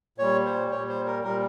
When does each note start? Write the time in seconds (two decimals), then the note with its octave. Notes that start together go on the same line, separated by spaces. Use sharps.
0.18 A#2 G3 C#5
0.46 C5
0.71 A#2 G3 C#5
0.89 C5
1.06 A#4
1.24 A#2 G3 A#4